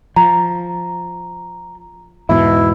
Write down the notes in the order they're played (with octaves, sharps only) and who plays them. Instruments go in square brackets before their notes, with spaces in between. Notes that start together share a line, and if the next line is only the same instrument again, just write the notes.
[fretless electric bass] F3 [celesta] A#5
[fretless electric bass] E2 G#2 B2 [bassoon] E4